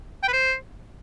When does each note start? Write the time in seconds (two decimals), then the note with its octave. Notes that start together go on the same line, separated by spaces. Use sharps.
0.23 G5
0.28 B4
0.33 C5